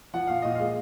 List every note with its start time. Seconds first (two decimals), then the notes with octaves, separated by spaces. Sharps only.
0.14 F3 F#5
0.27 A#2 F5
0.42 A#2 D#5
0.55 F5
0.60 G#3